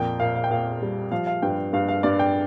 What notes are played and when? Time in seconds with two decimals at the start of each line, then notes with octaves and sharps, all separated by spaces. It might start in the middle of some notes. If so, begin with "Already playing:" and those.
Already playing: F2 A#2 G5
0.20 A#2 F5
0.35 F5
0.44 G5
0.51 A#2 F5
0.82 G3
1.11 F3 F5
1.27 F5
1.42 G2 G5
1.73 G2 F5
1.88 F5
2.03 G2 D5
2.19 G5